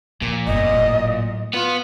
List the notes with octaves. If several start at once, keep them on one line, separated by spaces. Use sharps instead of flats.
A#2 F3
G1 F2 D#5
A2 F#3
B3 F4 B4